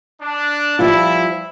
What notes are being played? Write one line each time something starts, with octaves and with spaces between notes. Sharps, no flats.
D4
F3 G3 E4 F4